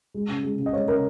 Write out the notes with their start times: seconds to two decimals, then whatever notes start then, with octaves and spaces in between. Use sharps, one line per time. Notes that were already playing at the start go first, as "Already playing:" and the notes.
0.14 G#3
0.29 C#3
0.43 G#3
0.59 C#3
0.66 D#5
0.73 G#3 C#5
0.88 C#3 A#4